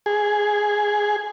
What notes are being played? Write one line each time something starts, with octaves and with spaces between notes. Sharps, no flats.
G#4